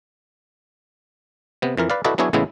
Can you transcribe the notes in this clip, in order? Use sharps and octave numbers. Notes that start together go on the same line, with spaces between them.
C3 B3
F2 E3 A#4
B4 D5 F5
E4 F#4 A4 B4 D5 D#5
F#3 B3 D4 E4 G#4 C#5
A1 A2 C#3 G#3 B3 E4